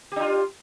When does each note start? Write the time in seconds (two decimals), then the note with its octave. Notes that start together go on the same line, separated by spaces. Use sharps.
0.12 G4
0.16 D4
0.21 F4